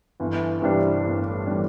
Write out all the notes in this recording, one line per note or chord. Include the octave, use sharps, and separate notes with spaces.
G1 E3
G2 C3 E3 G3 D4
G1 A2
E3 G3 D4